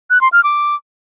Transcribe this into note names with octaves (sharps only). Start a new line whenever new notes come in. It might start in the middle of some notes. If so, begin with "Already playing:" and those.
F#6
C6
F6
D6